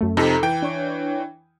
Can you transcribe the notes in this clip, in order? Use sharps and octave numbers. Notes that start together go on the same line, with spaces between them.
F#2 A3
F2 C3 D#4 A4 A#5
E3 G5
D4 C#5